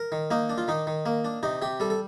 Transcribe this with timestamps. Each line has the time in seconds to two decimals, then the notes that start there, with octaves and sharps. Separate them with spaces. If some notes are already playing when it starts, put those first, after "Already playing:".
Already playing: A#4
0.12 D#3
0.31 A#3 D#4
0.49 D4
0.58 F4
0.68 D#3 D#4
0.87 D#3
1.06 A#3
1.25 D4
1.43 C3 D#4
1.62 C3 G4
1.80 G3 A4
1.90 A4